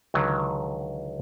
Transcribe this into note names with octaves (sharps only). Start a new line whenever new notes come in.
C#2 D3 D#3 F#3